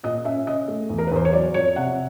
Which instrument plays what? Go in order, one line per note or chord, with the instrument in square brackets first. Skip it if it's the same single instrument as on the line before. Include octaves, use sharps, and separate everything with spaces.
[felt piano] A#2 D#5
C#4 E5
C#3 D#5
A3
E2
A#4
B4
E2 C5
C#5
F#3 D5
F2 C#5
C3 F#5